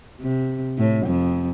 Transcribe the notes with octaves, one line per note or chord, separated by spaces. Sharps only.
C3
A2
F2